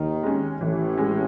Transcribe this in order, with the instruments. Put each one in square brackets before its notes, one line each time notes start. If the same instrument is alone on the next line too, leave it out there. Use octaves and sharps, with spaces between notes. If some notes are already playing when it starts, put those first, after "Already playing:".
Already playing: [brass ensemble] D#2 D#3
[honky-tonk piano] G#3 C#4
[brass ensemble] A1 A2 [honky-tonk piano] E3
[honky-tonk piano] G#3 C#4